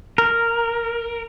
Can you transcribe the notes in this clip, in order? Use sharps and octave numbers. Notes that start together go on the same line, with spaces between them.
A#4